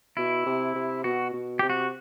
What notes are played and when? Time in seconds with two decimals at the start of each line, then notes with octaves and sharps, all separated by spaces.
0.17 B2 E4
0.46 C3
0.75 C3
1.04 B2 F#4
1.33 B2
1.59 C3 G4
1.70 F#4